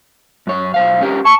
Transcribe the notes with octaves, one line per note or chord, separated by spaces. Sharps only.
F#2 C#5
B1 C5 F5
C#4 G4 A#4
A5 C#6